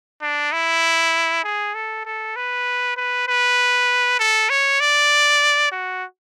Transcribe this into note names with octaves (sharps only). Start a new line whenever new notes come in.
D4
E4
G#4
A4
A4
B4
B4
B4
A4
C#5
D5
F#4